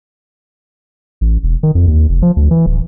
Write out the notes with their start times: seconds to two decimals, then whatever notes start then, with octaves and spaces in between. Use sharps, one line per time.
1.21 A1
1.43 E1
1.63 D#3
1.75 F2
1.87 D#2
2.09 F1
2.22 F3
2.37 D2
2.51 E3
2.66 D1